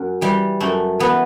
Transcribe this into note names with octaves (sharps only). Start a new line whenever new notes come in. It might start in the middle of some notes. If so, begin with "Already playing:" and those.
Already playing: F#2
E3 G3
F#2 A3
E3 B3